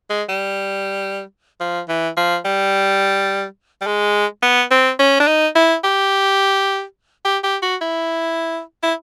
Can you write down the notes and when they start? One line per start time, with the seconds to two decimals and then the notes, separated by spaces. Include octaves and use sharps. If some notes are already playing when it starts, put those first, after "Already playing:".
0.10 G#3
0.29 G3
1.60 F3
1.89 E3
2.17 F3
2.45 G3
3.82 G3
3.86 G#3
4.43 B3
4.71 C4
4.99 C#4
5.20 D4
5.27 D#4
5.55 E4
5.84 G4
7.25 G4
7.44 G4
7.62 F#4
7.81 E4
8.83 E4